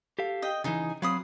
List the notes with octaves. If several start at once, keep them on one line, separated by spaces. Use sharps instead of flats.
G4 A4 F5
D#5 G5
C#3 E3 D#4 G#4
F#3 C4 F5 B5 D#6